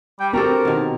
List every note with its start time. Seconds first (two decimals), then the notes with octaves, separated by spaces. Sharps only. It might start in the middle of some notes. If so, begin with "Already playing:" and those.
0.20 G3 G5
0.33 C4 D4 F#4 G4 A4 A#4
0.65 B2 D#3